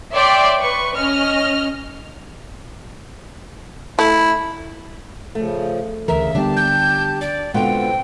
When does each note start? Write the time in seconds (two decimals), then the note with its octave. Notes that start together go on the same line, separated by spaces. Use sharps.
0.14 C#5 D5 E5 G5 C6 D6
0.60 B4 C#6
0.96 C#4 D#5 F6
3.99 A3 E4
5.35 C#3 F3 A3
6.08 D2 C#3 E3 A#4 E5
6.35 D3 G3 B3 D4 G4 A5
6.57 G6
7.21 D5
7.54 B2 D3 G#3 B3 C4 F4 G5